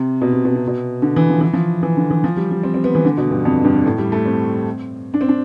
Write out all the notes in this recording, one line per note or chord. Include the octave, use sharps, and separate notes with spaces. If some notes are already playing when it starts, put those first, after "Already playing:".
Already playing: C3
B2
C3
B2
C3
B2
D3
E3
F3
E3
F3
E3
D3
E3
F3
G3
G3
C4
C4
B3
E3
D3
B2
G2
F2
G2
A2
G3
A3
C4
D4
C4
D4